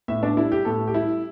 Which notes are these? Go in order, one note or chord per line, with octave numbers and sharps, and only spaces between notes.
A2 E5
D4
G3 E4
G4
A2 A4
G4
G3 E4